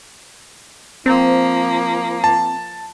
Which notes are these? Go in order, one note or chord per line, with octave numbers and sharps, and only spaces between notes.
F3 A#3 C4
A5